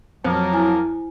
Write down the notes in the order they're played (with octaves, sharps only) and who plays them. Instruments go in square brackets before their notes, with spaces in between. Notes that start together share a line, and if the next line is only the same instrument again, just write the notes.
[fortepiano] F2 [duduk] F#3 [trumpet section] A#3 A#4 A5 [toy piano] C5
[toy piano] E4 G#5